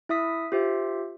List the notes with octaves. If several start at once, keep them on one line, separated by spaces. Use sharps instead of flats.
E4 E5 D#6 B6
F4 G4 C5 E5